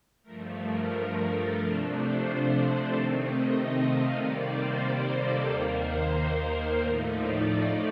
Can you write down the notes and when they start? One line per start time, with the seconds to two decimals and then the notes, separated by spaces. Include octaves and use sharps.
0.23 G2 F3 A3 A#4
0.57 A#4
1.22 A4
1.54 C3 F3 A3 D4 A#4
1.86 C5
2.52 D5
2.85 C3 D#3 A3 C4
3.17 D#5
3.83 F5
4.15 C3 D#3 G3 A#3 D5
4.48 C5
5.13 A4
5.45 D#2 D#3 A#3 A#4
5.79 C5
6.44 C5
6.76 A2 F3 A3 D#4 D5
7.09 D5